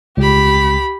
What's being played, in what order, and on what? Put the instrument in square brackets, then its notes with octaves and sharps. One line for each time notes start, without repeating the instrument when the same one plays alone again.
[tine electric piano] C#2 [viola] G4 B5